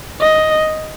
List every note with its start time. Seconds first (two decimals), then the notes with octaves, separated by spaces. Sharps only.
0.21 D#5